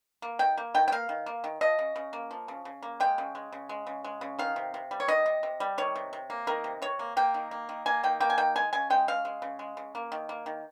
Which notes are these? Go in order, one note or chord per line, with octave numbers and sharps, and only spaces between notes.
A#3
D#3 G5
A#3
D#3 G5
G5
A#3 F5
D#3
A#3
D#3
F3 D#5
C#3
C#3
A#3
F3
C#3
C#3
A#3
G#3 G5
C#3
G#3
C#3
G#3
C#3
G#3
C#3
D#3 F5
C3
C3
G3
C#5
D#3 D#5
C3
C3
G3
D#3 C#5
C3
C3
A#3
D#3 A#4
C3
C3 C#5
A#3
A#3 G5
D#3
A#3
D#3
A#3 G#5
D#3 G5
A#3 G5
G#5
D#3 G5
G#3 G#5
C#3 G#5
G#3 G5
C#3 F5
G#3
C#3
G#3
C#3
A#3
D#3
A#3
D#3